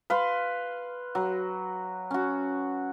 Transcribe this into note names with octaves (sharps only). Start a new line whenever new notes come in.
B4 F5 C6
F#3
C#4 F#4